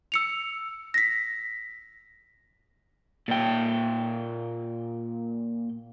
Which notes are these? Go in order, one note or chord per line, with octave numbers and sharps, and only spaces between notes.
E6 C#7 F7
A#6 B6
A#2 G5